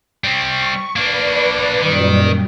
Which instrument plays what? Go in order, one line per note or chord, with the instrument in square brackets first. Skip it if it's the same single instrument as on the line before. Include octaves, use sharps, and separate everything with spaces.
[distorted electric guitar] G3 C4 [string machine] C#6
[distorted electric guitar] A#3 D4 [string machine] B4 D5
[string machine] F#2 A#2 G3 [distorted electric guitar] D#3